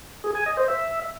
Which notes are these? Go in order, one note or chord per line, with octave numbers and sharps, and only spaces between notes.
G#4
G#5
D#5
C5
E5